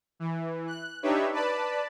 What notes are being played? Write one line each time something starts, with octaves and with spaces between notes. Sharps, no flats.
E3
F#6
D4 D#4 G4 B4 C#5 E5
B4 D5 A5 B5